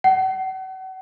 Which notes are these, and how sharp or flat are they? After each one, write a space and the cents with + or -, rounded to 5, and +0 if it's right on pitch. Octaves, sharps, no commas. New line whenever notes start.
F#5 +40